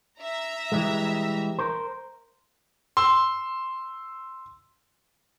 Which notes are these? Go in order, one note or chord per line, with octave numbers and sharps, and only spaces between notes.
E5 A#5
E3 G3 G#3
A#4 C5
C6 E6